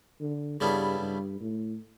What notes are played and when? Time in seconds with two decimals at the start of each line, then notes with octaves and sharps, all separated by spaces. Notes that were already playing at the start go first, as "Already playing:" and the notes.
0.21 D3
0.60 G2 C#3 G3 B3 E4 A4
1.00 G2
1.41 A2